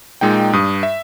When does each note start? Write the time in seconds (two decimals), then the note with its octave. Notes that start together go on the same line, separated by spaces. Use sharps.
0.21 A#2 G#3 D#4 G5
0.53 G2 D#6
0.83 E5